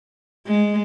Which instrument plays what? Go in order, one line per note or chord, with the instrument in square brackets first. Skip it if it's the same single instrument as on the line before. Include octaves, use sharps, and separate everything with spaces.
[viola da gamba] G#3